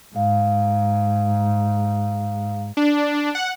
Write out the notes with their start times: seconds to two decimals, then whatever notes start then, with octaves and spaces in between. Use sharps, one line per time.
0.16 G#2 F5
2.77 D4
3.35 F#5